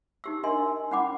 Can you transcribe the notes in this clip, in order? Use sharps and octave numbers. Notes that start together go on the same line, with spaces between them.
D#4 G4 E6
D4 A#4 D#5 G#5 C6
C#4 E4 F#5 B5 D6